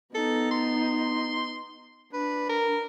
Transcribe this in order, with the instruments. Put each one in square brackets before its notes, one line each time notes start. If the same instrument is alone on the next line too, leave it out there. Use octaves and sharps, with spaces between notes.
[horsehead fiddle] B3 D#4 [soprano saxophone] A4
[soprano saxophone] C6
[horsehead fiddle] D4 [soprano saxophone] B4
[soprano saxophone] A#4